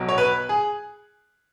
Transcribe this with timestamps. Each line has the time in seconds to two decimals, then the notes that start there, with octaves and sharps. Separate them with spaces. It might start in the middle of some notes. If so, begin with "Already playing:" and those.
Already playing: B1 B2 F#3
0.09 C#5
0.18 B4
0.49 G#4